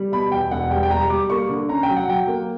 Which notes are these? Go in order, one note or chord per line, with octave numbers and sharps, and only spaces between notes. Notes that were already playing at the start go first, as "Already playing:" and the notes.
Already playing: G3
B2 B5
E2 G5
E1 F#5
G3 G5
G5
G3 A#5
G3 D6
A#3 C#6
D3
C#4 A#5
G5
F#3
F#5
F#3 G5
A#3